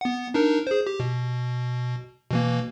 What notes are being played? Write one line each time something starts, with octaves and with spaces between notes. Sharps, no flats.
B3 F#5
D4 D#4 A#4
G#4 C5
G4
B2
B2 E3 A#3